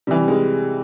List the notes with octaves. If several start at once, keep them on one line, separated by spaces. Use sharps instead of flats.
C3 E3 G3
G#3